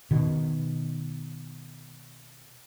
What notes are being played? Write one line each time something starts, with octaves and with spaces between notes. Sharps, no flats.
B2 D#3